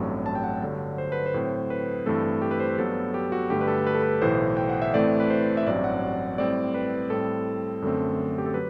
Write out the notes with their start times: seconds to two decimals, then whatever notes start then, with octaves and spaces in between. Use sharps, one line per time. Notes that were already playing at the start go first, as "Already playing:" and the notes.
Already playing: A1 G2 F#3 A3 C4
0.26 A5
0.35 G5
0.44 F#5
0.62 G2 D3 F#3
0.98 C5
1.12 B4
1.26 C5
1.34 A2 F#3 C4
1.70 B4
2.06 G2 E3 A3 C4 A4
2.42 G4
2.51 B4
2.60 C5
2.70 B4
2.78 G2 F#3 B3 A4
3.14 G4
3.32 F#4
3.50 G2 D3 A3 G4
3.61 B4
3.68 A4
3.87 B4
3.94 A4
4.03 B4
4.22 B1 A2 E3 C5
4.57 G5
4.69 F#5
4.82 E5
4.94 A2 E3 A3 C4 D5
5.20 B4
5.30 C5
5.57 E5
5.66 A1 G2 F#3 C4 D5
5.84 F#5
6.38 A2 G3 C4 D5
6.74 B4
7.10 A2 G3 C4 A4
7.82 F#2 D3 A3 C4
8.38 G4
8.46 A4
8.54 F#3 B4